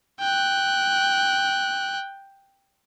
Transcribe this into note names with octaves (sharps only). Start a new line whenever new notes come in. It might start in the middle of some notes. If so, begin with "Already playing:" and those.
G5 F#6